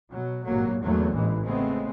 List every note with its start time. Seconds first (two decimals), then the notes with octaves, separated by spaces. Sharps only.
0.11 B2 F#3
0.47 G#1 G2 A#2 F#3 A#3
0.82 E2 G#2 D3 F#3 A3 A#3
1.15 A1 G#2 E3 G#3
1.45 C#3 G#3 A3 B3 C4